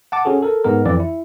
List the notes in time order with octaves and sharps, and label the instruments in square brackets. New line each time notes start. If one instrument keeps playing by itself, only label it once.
[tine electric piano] F#5 A5 D6
C#4 F#4 G#4 A4
A4 A#4
G#2 G#3 B3 A#4
F2 E3 D5
E4